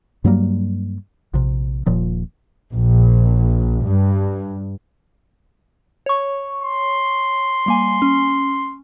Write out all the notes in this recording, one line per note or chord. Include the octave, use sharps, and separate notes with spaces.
G2 F#3 G3 A#3
A#1 C3
D#1 A#2 F3
A#1
G2
C#5 C#6
C6
G3 A#3 G#5
C#4